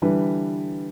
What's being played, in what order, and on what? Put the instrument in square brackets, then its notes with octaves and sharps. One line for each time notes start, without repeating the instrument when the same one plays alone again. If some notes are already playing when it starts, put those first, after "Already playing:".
[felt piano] D3 E3 G3 B4